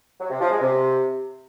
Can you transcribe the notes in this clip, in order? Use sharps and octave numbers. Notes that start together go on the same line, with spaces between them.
F#3
C3
F3
G#3
C3